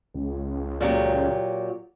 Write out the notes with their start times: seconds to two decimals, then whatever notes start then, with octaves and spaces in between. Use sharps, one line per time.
0.14 C#2
0.81 A#2 F#3 G4